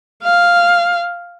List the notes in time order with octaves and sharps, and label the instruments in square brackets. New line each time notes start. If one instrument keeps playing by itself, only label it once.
[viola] F5